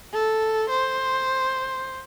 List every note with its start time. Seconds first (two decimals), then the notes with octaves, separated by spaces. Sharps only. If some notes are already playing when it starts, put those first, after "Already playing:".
0.13 A4
0.69 C5